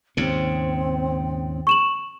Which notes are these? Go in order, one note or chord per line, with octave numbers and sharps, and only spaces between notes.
D#2 G#2 C#3 C4
C#6 E7 F#7